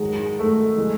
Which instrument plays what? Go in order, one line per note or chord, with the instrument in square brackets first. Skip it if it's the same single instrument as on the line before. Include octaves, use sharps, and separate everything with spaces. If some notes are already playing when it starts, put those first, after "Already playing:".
Already playing: [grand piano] G#2 D#3 F#3 [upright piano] G#3
[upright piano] A3
[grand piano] E3 G#3